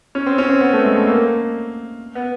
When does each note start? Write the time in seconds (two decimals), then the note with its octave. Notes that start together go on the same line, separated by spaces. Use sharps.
0.15 C#4
0.26 C4
0.38 C#4
0.49 C4
0.61 B3
0.73 A3
0.84 G#3
0.96 A3
1.07 A#3
2.15 B3